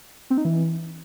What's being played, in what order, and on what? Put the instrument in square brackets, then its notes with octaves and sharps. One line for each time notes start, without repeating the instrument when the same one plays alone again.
[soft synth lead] C4
D#4
E3